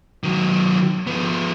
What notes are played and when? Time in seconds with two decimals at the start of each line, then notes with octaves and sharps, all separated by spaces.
0.24 D#3 F#3
1.07 F3 B3